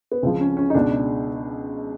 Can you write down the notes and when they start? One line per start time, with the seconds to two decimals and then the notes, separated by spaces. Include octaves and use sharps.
0.12 B3
0.23 C#2 C#3 F3 C4
0.40 C#4
0.57 C#4
0.70 D#4
0.74 C#2 B2 D4